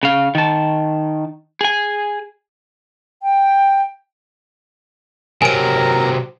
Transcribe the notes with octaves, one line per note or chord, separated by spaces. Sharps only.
C#3 F5
D#3 A5
G#4 G#5
G5
C3 F#3 A#4 G#5 A#5 D7